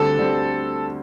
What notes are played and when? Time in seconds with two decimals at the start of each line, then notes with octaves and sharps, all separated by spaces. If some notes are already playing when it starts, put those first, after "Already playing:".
Already playing: D2 D3 G3 C4 A4
0.19 D3 G3 C4